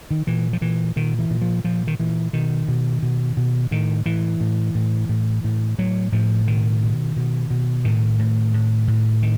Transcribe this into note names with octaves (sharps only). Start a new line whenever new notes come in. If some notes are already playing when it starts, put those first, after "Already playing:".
D#3
A#2 E3
F3
A#2 E3
A#2 D#3
E3
A#2
F3
A#2 F3
D#3
A#2 E3
B2 D#3
B2
B2
B2
A2 D#3
A2 E3
A2
A2
A2
A2
A2 F#3
A2 F3
B2 D#3
B2
B2
B2
A2 D#3
A2
A2
A2
D#3